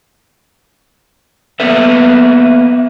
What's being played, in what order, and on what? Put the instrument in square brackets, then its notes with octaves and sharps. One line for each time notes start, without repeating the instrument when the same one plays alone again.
[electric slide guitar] A#3 B3 A4 B4 E5